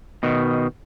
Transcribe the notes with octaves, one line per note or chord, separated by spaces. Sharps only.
B2 D#3